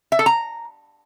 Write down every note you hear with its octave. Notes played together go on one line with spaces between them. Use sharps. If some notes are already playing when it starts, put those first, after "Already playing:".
E5
A4
A#5